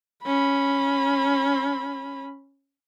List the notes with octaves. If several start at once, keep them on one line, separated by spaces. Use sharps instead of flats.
C#4 B5